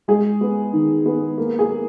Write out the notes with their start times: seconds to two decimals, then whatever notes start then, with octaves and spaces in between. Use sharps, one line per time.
0.08 G#3 G#4
0.41 B3
0.73 D#3
1.06 B3
1.38 A#3
1.59 G#4
1.70 A#3